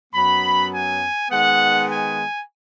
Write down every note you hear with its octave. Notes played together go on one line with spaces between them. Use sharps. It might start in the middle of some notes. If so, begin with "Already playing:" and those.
F#2 F#3 B3 B5
G#5
D#3 G#3 B3 D#4 F#5
G#5